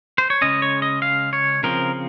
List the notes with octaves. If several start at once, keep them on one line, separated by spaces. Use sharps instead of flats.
C5
C#5
C#3 G#3 C#4 D#5
C#5
D#5
F5
C#5
C#3 F3 C4 A#4